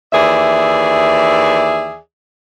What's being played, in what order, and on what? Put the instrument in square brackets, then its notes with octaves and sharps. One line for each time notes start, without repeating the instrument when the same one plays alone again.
[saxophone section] D#2 E3 G#4 D5 E5